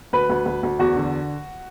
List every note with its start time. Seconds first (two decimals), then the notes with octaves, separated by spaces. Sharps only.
0.13 D2 B4
0.30 D2
0.46 D2
0.63 D2
0.79 E2 F#4
0.96 D3